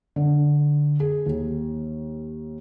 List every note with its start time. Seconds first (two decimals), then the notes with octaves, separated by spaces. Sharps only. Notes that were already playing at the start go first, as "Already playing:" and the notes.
0.16 D3
1.00 G#4
1.26 D#2